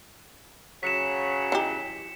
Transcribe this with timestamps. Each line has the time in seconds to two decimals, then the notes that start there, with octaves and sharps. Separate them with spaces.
0.83 C#3 F#3 B6 C#7 E7
1.52 E3 D#4 G4